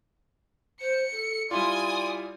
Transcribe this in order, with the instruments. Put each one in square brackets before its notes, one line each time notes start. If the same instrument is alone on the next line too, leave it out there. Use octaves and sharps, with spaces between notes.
[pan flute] C5 [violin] C#7
[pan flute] A4
[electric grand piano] G3 E4 F4 [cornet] D5 [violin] G#5 D#6 [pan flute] C6